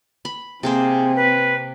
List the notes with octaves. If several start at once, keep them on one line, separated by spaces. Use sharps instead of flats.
B5
C3 A#3 C4 G#4 C5
B4